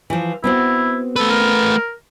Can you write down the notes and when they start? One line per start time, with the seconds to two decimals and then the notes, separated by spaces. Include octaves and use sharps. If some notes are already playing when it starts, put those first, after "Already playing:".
0.10 E3 F3
0.44 B3 C4 E4 F#4
1.16 A3 A4 B4
1.30 A#4